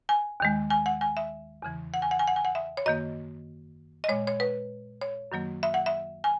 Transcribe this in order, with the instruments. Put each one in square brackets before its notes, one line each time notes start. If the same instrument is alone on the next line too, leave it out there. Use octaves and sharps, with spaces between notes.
[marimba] G#5
D#2 D#3 G#3
G#5
F#5
G#5
E5
E2 C#3 E3
F#5
G#5
F#5
G#5
F#5
G#5
F#5
E5
C#5
F#2 D#3 A#3 D#5
D#5
A#2 G#3 C#5
C#5
B4
C#5
F#2 D#3 F#3 A#3
E5
F#5
E5
G#5